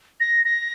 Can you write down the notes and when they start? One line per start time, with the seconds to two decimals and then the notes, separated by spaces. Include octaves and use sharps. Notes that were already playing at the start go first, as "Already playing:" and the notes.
0.20 A#6
0.45 A#6